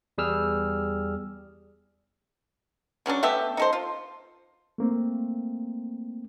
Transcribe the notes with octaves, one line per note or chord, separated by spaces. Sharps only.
E2 G3 G#4 E6 F6
C#3 F#3 C#4 D4
A3 B3 G4 E5
D#4 A4 C5
F4
A3 A#3 C4